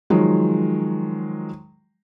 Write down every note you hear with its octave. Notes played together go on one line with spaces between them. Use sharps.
D#3 F3 F#3 G#3